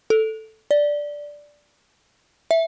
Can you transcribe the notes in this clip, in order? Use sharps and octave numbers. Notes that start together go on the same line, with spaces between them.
A4
D5
E5